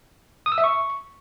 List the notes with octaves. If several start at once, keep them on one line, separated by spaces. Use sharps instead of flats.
D#6
E6
E5
C#6